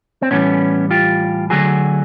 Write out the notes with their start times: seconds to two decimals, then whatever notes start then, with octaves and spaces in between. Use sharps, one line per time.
0.22 C4
0.31 A2 E3 G3 B3 C#4
0.91 F4 G4
1.50 D3 F#3 A3 F#4 G#4